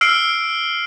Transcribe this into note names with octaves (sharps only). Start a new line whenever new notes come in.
E6 F6 C7 D7